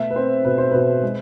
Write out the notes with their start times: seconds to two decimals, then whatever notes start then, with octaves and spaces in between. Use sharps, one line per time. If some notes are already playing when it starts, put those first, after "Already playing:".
Already playing: B2 A3 B3 E5
0.11 B4
0.16 C4 C5
0.45 B2 B4
0.58 C5
0.71 B2 B4
1.02 G#3